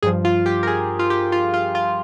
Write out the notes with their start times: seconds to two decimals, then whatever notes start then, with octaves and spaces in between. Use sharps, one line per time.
0.02 G2 F3 G#4
0.25 F4
0.46 G4
0.63 A#4
0.67 G#4
0.99 F4
1.10 G4
1.32 F4
1.54 F4
1.75 F4